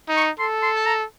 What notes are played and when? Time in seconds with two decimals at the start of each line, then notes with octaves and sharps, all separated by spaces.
0.09 D#4
0.16 C#6
0.39 A4 C6
0.63 C6
0.76 A5
0.86 A#5